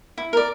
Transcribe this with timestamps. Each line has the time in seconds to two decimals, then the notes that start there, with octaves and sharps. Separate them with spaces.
0.18 E4
0.33 A#4 D5